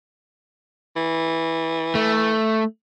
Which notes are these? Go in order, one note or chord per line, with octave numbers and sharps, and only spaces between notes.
E3
A3